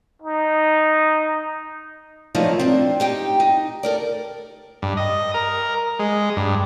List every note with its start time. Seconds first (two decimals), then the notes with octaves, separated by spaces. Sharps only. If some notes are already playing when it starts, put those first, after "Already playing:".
0.22 D#4
2.35 F3 F#3 A3 A#3 D4 D#4
2.59 C4 D4
3.00 D#4 G4 G5
3.40 D#4
3.83 A4 A#4 D5
4.82 G2
4.97 D#5
5.34 A#4
5.99 G#3
6.36 G2